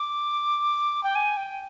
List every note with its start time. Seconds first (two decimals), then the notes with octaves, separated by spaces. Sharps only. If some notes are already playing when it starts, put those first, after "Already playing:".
Already playing: D6
1.03 G5
1.15 G#5
1.37 G5